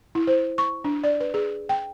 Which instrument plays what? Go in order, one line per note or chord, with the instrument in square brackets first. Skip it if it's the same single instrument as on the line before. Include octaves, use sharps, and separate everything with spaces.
[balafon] E4
C5
C#6
D4
D5
B4
G#4
G5